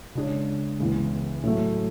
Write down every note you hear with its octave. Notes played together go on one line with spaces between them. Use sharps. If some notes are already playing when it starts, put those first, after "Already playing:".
C#3 G#3 D4 G#4 C#5
C#2 C#3 E3 B3
A2 F#3 A3